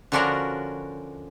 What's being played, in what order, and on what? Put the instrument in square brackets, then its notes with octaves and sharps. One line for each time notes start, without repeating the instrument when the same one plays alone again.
[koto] D3 F3 C#4 D4 F#4 A#4